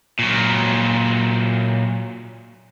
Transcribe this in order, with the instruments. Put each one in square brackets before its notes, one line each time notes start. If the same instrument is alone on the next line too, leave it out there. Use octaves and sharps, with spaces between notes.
[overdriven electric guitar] A#2 F#3